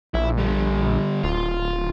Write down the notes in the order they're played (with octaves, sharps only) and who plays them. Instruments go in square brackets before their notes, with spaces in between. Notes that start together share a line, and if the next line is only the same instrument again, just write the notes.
[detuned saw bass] A#1 [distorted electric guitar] E4
[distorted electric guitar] D3 G3
[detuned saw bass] D1 [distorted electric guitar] F4